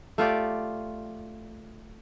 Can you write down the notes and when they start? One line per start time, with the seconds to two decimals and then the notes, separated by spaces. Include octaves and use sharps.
0.18 A3 F4 G4 D5